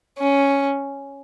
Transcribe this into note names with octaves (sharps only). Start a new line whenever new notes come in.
C#4